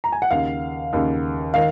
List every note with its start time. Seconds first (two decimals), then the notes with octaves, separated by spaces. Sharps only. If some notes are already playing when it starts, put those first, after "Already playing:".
0.04 A#5
0.12 G#5
0.22 F#5
0.31 D#2 C#3 F5
0.93 D#2 C#3
1.54 D#3 F5